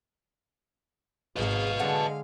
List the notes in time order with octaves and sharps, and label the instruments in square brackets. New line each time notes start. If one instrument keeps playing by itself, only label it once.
[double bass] G#1 G#2 [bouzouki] F4 G#4 [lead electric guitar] B4 D#5 [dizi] F5
[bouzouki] A2 F#5 A5 [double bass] D3 G#3